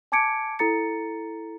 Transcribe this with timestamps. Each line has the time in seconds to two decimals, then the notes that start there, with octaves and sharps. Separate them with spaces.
0.12 G#5 A5 D6 G#6 C#7 D7
0.59 E4 A4 A#5 A6 C#7